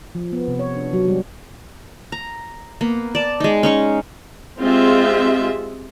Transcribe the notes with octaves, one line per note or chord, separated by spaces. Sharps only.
F3
B3
C3
C#5
D4
F#3
G3
A#5
A#3 B3
D5 A5
G#3 D#4
C#4 D#4 C#6
G#3 C4 F4 G4 G#4 E5